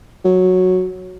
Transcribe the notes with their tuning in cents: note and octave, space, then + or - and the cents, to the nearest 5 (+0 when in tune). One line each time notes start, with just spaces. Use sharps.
F#3 -5